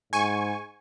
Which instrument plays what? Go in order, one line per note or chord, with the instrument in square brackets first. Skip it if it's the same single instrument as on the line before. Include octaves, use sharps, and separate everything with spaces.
[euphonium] G#2 [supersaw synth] G#5 C#6